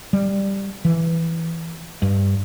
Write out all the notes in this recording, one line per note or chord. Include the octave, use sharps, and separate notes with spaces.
G3
E3
G2